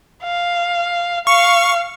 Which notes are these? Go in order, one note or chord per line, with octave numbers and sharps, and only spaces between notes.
F5
F5 C#6